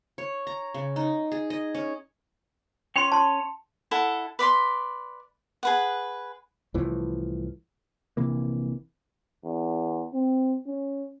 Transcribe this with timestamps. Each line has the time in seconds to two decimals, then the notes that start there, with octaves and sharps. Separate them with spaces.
0.18 C#5
0.47 A#5
0.74 C#3
0.96 D#4
1.32 G#4
1.50 D#5
1.74 C#4
2.96 C#4 C#5 G5 C6
3.12 A5 C6
3.91 E4 A4 F#5
4.39 B4 D5 B5 C6
5.63 G#4 B4 F#5
6.74 C2 A2 E3 F3
8.17 A#1 C3 E3 A#3
9.44 E2
10.13 C4
10.66 C#4